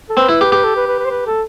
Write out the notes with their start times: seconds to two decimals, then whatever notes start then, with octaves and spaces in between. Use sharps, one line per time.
0.09 A4
0.17 C4 B4
0.29 E4
0.41 G4
0.52 G4
0.64 A4
0.76 B4
0.87 B4
0.99 B4
1.05 C5
1.11 B4
1.26 A4